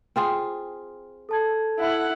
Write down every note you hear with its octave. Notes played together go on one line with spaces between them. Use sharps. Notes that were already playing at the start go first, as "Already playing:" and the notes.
C4 F4 G#4
A4 A5 G#6
E4 F#5